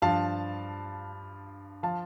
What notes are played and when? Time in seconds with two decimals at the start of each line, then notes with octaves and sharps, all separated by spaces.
0.02 G2 F3 F5 A5
1.83 F3 F5 A5